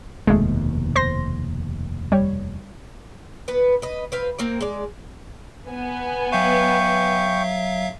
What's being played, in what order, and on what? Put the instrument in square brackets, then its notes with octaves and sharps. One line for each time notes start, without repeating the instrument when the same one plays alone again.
[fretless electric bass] F1 D#2 B2 [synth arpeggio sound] G#3 A3
[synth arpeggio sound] C5 C6 A#6
G3 C#5
[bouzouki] B3 B4
B4 D#5
C4 B4 F5
A#3 C4 A#4
G#3 D5
[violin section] B3 G#5
[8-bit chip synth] F#3 E5 F5 [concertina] G5 C#6